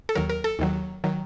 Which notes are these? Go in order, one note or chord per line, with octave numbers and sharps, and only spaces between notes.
A4
D#2 D#3 F#3 A#4
A#4
A4
D#2 D#3 F#3
D#3 F#3